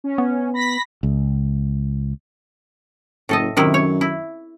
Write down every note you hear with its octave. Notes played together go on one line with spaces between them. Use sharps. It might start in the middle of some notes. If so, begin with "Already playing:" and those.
C#4
B3
B5 A#6 B6
C#2
F#1 A2 A4 D#5
F#2 C3 D#3 E4
C#5
E4